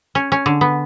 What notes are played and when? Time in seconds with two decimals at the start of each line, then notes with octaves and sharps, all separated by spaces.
0.15 C#4
0.32 C#4
0.46 D3
0.61 B3